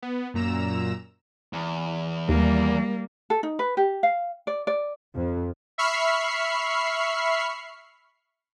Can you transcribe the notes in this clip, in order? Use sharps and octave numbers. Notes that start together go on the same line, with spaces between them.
B3
F#2 A#2 A#5 E6 E7
E2
D#2 G3 A#3
A4
D#4
B4
G4
F5
D5
D5
F2
E5 B5 C#6 F6 C7